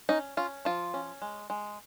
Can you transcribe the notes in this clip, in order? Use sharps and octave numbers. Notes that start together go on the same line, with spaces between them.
C#4 D#4
C#4 F4
F3 F4
C#4
G#3
G#3